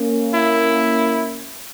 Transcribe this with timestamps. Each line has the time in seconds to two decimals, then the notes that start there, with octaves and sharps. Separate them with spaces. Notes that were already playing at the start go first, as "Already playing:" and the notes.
Already playing: A#3 C#4
0.34 E4